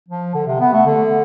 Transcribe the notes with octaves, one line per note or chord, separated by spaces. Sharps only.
F3
D3
C3
B3
A3
D3